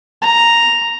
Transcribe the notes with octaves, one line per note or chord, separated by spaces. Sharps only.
A#5